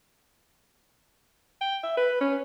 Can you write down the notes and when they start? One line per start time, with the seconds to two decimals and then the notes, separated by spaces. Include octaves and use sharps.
1.61 G5
1.83 E5
1.97 B4
2.21 C#4